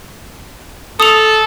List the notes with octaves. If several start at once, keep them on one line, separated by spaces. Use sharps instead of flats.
A4 D#6 F7